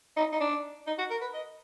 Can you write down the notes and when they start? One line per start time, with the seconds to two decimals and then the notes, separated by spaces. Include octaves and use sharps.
0.17 D#4
0.32 D#4
0.41 D4
0.87 D#4
0.98 F#4
1.10 A#4
1.21 B4
1.34 D#5